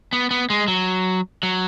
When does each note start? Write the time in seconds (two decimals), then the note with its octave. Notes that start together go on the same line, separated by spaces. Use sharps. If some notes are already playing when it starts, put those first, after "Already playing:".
0.13 B3
0.31 B3
0.50 G#3
0.68 F#3
1.43 F#3